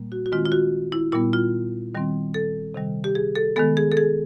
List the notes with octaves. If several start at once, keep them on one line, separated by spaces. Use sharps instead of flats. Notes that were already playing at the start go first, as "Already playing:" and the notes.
Already playing: A#2 G3 A#3
F#4
F#4
D#3 G#3 C4 F4
F4
F#4
E4
A#2 G3 B3 E4
F4
D#3 G3 C4
A4
C3 D#3 G3
G4
G#4
A4
D#3 G#3 B3 A4
G#4
A4
G#4